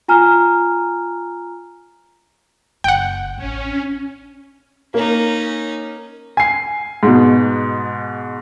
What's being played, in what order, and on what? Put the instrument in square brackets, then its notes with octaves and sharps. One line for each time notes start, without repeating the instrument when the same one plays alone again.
[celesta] F4 G#5 A#5 F6
[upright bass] F#1 [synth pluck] F#5 G5
[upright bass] A1 [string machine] C#4
[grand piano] A#3 [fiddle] C#4 D#4
[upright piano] G#5 C7
G#2 B2